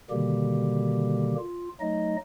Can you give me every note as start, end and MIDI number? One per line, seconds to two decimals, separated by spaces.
0.10 1.35 47
0.10 1.35 50
0.10 1.35 51
0.10 1.35 55
0.10 1.35 58
0.10 1.35 67
1.39 1.69 65
1.80 2.16 54
1.80 2.16 57
1.80 2.16 63
1.80 2.16 75